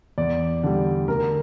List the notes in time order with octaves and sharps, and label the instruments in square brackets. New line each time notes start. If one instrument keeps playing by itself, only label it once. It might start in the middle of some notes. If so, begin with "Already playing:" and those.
[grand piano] E2 D5
D3 G3
D2 A#4